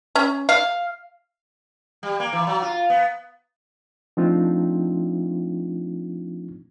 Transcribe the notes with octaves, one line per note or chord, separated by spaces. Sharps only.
C#4
F5
G3
A#3
E3
F#3
F4
B3
F3 A3 C4 D4 D#4 F4